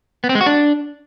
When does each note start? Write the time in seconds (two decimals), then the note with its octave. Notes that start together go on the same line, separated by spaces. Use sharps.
0.24 B3
0.29 C4
0.35 G#3
0.41 F#4
0.46 D4